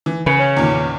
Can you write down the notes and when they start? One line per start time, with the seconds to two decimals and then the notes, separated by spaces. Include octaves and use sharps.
0.06 E3
0.26 C#3 B4
0.39 C#4
0.57 E2 A#2 D#3